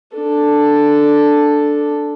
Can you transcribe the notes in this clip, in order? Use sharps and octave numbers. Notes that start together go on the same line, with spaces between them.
D4 A4